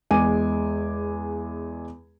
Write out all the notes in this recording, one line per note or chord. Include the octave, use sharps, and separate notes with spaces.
E2 G#3 G#5 D6 D#7